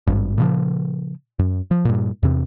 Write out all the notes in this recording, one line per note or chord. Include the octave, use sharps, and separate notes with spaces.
G#1 G2
A#2 C#3 F3
F#2
F3
G2 A#2
E2 C3 C4